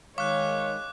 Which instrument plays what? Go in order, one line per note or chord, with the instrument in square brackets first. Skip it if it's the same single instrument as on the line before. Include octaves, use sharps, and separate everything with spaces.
[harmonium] D#3 G#3 [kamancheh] C#5 [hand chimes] F5 C#6 [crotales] D6 F#6